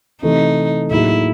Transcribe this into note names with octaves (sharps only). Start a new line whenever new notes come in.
C3 E3 A3 D#4
A2 F#3 A#3 D#4 E4 G#4